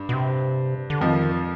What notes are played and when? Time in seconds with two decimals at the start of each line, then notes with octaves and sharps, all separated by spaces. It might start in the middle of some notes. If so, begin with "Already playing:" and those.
Already playing: G2
0.09 B2
0.13 C3
0.90 D3
1.01 F2 D#3 F3